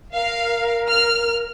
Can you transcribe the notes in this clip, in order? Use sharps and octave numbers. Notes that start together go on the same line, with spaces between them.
A#4 F5
F6